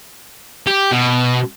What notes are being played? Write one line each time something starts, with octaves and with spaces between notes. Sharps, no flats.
G4
B2